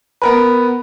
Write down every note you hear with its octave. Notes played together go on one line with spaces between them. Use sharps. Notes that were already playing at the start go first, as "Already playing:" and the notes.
B3 A#4 B4